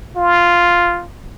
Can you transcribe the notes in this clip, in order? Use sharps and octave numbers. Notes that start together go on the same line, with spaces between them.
F4